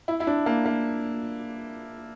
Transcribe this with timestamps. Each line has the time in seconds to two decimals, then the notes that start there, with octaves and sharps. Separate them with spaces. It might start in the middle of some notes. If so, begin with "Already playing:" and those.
0.08 E4
0.20 E4
0.27 D4
0.46 A#3
0.65 A#3